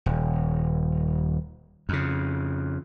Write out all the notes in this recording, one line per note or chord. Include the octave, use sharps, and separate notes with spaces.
D#1
F2 C#3